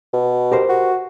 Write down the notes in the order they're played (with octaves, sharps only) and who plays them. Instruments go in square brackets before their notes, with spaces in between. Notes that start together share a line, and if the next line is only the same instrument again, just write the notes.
[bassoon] B2
[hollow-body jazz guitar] G4 A#4 C5
[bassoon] F#4